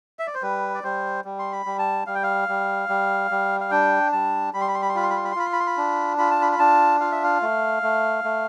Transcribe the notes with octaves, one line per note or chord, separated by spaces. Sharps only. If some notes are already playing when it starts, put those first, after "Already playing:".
E5
D5
C5
G3 B4
D5
G3 C5
G3
C6
B5
G3
A5
G3 F5
G5
F5
G3
G3
G3
F5
D4 G5
G3 A5
G3 B5
C6
B5
C6
B5
C6
F4 B5
C6
B5
C6
B5
C6
F4 B5
C6
B5
C6
B5
D4
F4 B5
A5
B5
B5
D4 A5
F4 F5
E5
F5
A3
A3
A3